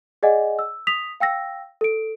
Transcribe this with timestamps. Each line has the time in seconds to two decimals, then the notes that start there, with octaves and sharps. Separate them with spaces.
0.23 G#4 D5 D#5 F#5 G#5
0.59 E6
0.87 D#6 B6 F7
1.20 F5 G5 E6 A#6
1.81 A4 D7